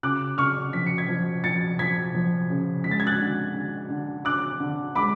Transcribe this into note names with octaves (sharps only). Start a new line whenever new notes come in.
C#3 D6 F#6
C#3 C#6 F6
F3 B6
C#7
G#6 B6
F3
F3 A6 C#7
F3 G#6 B6
F3
C#3
G#3 B6
A6
G#6
F#6 A6
D3
D3
D3
D3 D6 F#6
D3
G#3 B5 D6